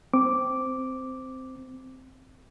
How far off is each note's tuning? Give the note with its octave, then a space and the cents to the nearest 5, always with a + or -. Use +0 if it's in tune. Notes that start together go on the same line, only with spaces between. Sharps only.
C4 -10 D6 -5